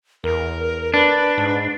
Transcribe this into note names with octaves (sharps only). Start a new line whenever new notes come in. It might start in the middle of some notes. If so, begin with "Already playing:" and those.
E2 A#4
D4 B4
G#2